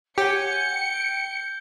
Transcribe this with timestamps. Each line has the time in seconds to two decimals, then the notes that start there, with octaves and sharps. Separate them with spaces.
0.18 G4 C#5 F#5 G#5 G6 C#7 G7
0.69 G5